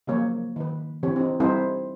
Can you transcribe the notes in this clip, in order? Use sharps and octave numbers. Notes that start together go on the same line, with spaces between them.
C#3 F3 F#3 A#3 C#5
D#3 B4
D3 E3 C4 G4 C#5
C4 D#4
G3 C4 D#4 E4 A4 C5